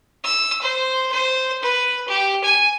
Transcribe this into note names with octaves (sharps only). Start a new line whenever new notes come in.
E6
C5
C5
B4
G4
G#5